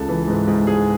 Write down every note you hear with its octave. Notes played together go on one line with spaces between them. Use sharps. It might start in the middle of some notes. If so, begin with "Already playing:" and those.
Already playing: C#2 A4
E3
G#2
G#2
G#2 G#4